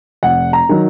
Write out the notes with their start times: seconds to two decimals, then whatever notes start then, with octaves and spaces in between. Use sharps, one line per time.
0.23 F1 F#5
0.53 A#5
0.69 D#3 F#3